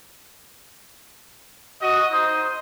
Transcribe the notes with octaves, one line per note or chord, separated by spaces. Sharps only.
F#4 D#5
D#4 C5 D#6